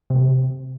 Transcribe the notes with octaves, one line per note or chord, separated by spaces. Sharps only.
C3